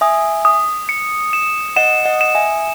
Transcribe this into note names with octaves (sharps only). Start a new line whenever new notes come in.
E5 G#5 D#6
D#6
C#7
E7
D#5 F#5 E7
D#5 F#5
E7
E5 G#5